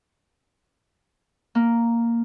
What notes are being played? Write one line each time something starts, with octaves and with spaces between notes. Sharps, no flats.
A#3